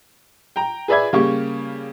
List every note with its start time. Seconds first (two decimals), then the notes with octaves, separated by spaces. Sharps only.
0.56 G5 A#5
0.88 G#4 B4 D5 E5 B5 G#6
1.13 C#3 G3 A#3 G4 C#6